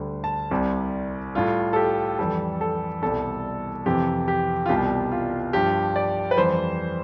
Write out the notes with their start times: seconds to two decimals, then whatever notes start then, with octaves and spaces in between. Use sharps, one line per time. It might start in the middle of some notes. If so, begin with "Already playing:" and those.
Already playing: D2 D3 G3
0.24 A5
0.51 C2 C3 G3
1.35 A2 G3 F4
1.73 A4
1.76 G4
2.19 F2 E3 G3 A4
2.61 A4
3.02 C2 B2 G3 A4
3.86 F2 C3 E3 G4
4.28 G4
4.66 F4
4.69 C2 B2 G3 G4
5.12 F4
5.53 G2 F3 G4
5.96 D5
6.31 B4
6.37 F2 E3 G3 C5